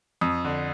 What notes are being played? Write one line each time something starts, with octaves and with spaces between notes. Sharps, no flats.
F2 D#6
D3